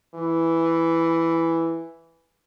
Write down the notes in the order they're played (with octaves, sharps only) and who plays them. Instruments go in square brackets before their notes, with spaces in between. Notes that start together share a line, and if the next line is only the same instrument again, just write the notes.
[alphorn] E3